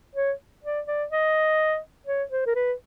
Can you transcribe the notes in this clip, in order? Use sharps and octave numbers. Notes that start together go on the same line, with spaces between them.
C#5
D5
D5
D#5
C#5
C5
A#4
B4